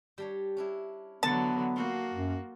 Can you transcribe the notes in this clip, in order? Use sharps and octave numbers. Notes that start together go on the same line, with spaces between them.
G3 D4 C#5
C#4 D4 E4
D3 E3 F#3 B3 A5
A#3 F4 F#4 A4 C5
F#2